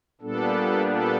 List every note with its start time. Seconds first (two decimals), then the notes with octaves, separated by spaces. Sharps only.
0.21 A#2 G3 B3 D4 A4
0.87 A4